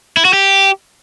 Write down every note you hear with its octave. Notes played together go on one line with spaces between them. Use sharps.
E4
F#4
G4